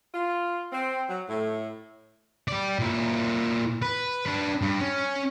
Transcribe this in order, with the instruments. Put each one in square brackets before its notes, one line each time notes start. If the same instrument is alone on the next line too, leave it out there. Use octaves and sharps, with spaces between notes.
[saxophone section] F4
C4
F#3
A2
[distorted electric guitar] G4 D5
A#2 E4
B4
D4 B4
G2
C#4